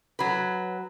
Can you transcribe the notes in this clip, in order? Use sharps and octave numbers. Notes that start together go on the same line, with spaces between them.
F#3 B4